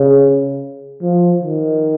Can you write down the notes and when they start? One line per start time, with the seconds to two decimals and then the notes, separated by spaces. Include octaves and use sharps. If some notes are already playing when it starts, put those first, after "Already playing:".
Already playing: C#3
1.03 F3
1.43 D#3